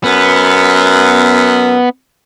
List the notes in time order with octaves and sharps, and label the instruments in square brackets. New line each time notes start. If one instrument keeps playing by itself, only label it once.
[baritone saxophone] F#2 [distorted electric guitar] B3